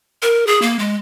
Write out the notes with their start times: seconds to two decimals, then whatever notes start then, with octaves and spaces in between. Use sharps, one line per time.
0.22 A#4
0.47 G#4
0.62 A#3
0.79 G#3